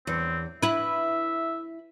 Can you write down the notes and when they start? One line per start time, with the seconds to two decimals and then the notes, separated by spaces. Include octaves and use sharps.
0.07 E2 C4
0.62 E4 B4 E5